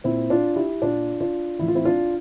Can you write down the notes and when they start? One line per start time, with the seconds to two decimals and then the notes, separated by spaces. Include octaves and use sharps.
0.04 A#2 C4 E4
0.30 D4 F4
0.56 E4 G4
0.82 A#2 D4 F4
1.21 D4 F4
1.59 A2 E3 E4
1.68 F4
1.75 C4 E4
1.85 D4 F4